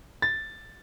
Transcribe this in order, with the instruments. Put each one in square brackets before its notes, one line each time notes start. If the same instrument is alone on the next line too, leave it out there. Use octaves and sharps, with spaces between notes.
[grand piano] A6